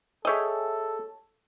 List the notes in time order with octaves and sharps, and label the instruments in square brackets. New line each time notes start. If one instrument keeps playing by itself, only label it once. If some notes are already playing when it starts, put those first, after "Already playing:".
[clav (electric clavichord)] G#4 E5 G5 [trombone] A4 [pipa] C#5 D#5